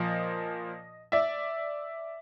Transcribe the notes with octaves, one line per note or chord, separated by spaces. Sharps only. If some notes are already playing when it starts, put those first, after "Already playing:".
Already playing: A#2 F3 D#5
D5 E5